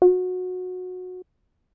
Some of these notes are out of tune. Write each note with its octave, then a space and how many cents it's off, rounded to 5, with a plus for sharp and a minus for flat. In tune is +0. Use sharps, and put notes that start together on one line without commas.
F#4 -20